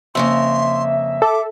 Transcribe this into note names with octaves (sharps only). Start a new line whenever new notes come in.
F2 C#3 A#3 E5 C6
A4 D6